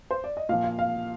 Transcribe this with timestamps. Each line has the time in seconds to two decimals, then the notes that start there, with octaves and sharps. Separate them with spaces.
0.11 C5
0.24 D5
0.37 D#5
0.49 A#2 F3 F5
0.64 F5
0.79 F5